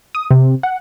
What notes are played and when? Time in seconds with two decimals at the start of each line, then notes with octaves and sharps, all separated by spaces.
0.15 D#6
0.31 C3
0.63 F#5